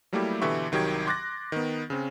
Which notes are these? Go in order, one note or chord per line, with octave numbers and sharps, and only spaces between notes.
F#3 G3 A3 A#3 E4 G4
B2 D3 E3 G4 E5 C#6
C2 D#3 F#3 G4 G5 G#6
C6 D6 F#6 A6 A#6
D#3 B3
C#3 C4 C#4